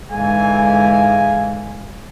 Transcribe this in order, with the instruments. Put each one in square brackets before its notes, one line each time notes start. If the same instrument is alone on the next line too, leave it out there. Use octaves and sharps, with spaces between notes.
[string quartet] G#2 D3 E3 [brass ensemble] G#3 G#4 F5 [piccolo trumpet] G#5